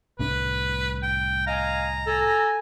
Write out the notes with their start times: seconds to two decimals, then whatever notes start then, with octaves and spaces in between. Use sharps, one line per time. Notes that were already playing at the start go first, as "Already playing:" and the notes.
0.19 C2 A2 D4 B4
1.03 G5
1.47 D#5 F5 G#5 A#5
2.07 A4 G#5